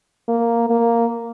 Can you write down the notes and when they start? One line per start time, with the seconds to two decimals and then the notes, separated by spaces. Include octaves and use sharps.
0.29 A#3
0.70 A#3